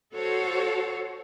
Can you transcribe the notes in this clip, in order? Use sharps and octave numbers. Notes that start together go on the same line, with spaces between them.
F#4 A4 C5 C#5